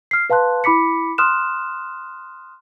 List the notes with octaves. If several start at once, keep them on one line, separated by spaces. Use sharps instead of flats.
F6 C7
B4 F5 A5 C6 F#6
E4 B5 D6 B6 C#7
C6 D#6 F6 F#6 E7